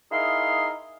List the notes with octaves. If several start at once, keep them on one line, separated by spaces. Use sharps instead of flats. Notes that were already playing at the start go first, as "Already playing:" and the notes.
D#4 E4 G#4 A#4 F5 C6